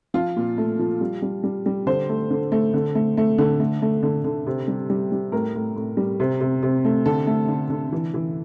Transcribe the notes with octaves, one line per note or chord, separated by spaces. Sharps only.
F3 F4
A#2
A3
F3
G3
G3
G3
G3
D3 C5
A3
D3
A3
D3
A3
A3
D3
A3
A3
D3
D3
C3
G3
G3
G3
A2 A#4
A2
A2
G3
C3
C3
C3
A3
D3 A4
A3
D3
D3
E3
E3